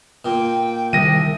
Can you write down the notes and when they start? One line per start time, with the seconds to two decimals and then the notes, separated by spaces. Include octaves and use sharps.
0.25 A#2 G5
0.93 C2 D#3 A#6 D#7